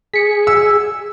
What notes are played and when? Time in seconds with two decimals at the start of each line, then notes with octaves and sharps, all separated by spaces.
0.14 G#4 B6 C#7
0.47 E6